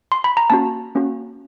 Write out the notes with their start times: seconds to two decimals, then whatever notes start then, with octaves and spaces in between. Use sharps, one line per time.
0.12 C6
0.24 B5
0.37 A#5
0.50 A#3 C#4 F#4 A5
0.95 A#3 C#4 F#4